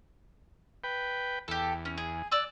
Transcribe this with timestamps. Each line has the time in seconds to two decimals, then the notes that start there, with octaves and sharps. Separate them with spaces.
0.84 B4 G5
1.48 E2 G4 A4
1.85 C#4
1.98 G#4
2.32 D5 E6 F#6